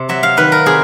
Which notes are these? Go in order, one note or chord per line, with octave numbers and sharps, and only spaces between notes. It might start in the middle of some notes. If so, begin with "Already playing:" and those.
Already playing: C3
F#3 E5
F5
D#3 B4
A#4
C3 G#4